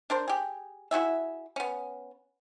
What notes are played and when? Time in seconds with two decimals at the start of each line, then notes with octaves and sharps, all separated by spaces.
0.10 D4 A#4 C5
0.28 G4 G#4
0.91 E4 F#4 G#4 E5
1.56 B3 C#4